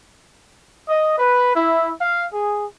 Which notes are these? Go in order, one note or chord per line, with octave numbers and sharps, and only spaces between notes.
D#5
B4
E4
F5
G#4